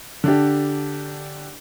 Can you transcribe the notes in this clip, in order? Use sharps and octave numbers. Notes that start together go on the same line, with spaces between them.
D3 D4 G4